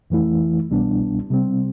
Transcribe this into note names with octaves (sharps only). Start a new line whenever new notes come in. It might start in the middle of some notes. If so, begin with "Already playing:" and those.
F2 E3 A3 E4
C2 B2 G3 B3 D4
C3 G3 C4